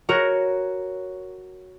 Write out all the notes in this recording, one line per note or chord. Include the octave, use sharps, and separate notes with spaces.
F#4 A#4 C#5 A#5